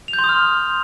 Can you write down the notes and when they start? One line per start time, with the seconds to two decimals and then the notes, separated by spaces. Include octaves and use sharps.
0.08 F7
0.13 G6
0.19 C6
0.24 D#6
0.29 F6